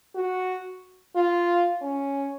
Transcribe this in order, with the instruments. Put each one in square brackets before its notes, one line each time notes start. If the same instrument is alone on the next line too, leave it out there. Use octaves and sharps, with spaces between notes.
[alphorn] F#4
F4
C#4